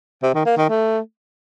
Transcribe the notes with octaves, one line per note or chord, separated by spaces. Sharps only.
C3
D#3
A#3
D#3
A3